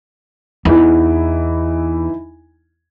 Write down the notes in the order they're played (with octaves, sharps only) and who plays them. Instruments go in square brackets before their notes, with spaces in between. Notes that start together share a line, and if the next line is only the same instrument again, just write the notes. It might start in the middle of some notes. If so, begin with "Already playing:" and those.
[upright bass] E2 [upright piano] E3 D#4 E4